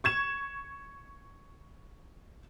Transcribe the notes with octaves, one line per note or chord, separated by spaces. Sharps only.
C#6 G#6 E7